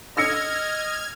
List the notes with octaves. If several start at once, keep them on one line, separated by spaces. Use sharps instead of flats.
D#5 E6 F6 G#6 A#6 C#7